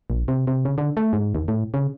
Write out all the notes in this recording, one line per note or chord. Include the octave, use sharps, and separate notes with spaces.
A#1
C3
C3
C#3
D3
A3
G#2
D#2
A2
C#3